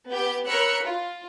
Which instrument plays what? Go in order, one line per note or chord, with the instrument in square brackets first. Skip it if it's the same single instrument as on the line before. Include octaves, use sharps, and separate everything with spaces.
[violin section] B3 G4 G6
A#4 C#5 B5 E6 F#6 C#7
F4